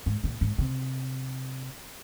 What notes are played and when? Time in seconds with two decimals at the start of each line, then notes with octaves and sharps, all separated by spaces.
0.06 G#2
0.24 A#2
0.41 G#2
0.58 C3